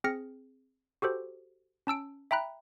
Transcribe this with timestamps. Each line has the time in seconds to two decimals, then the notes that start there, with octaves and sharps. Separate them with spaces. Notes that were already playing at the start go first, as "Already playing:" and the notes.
0.04 C4 G#4 F6 A#6 C#7
1.02 F#4 G4 A4 C5
1.87 C#4 A5 E6 D7
2.31 E5 G5 A#5 B5 F#6